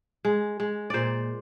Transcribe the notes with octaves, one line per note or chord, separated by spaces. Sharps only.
G#3
G#3
A#2 C5 D5